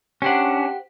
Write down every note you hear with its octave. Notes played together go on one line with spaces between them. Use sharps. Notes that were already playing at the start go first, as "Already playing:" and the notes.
C#4 D4 G4 C5 F#5